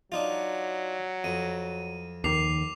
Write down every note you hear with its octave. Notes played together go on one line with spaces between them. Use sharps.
F#3 D4 D#4 F4
F2 D#7
D#2 D#3 D6 C7 F7